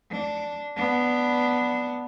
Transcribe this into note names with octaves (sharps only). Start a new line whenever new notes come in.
D4
B3 D4